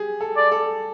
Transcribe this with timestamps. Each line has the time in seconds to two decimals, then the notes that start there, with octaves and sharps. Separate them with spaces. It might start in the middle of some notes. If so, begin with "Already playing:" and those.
Already playing: G4 G#4
0.21 A4
0.37 D5
0.52 A4